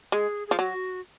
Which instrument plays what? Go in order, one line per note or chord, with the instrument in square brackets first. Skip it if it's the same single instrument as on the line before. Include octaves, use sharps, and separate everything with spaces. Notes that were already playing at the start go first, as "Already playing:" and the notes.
[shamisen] G#3 [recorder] G#4
[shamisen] F3 [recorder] G#4
[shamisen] F#3 [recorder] F#4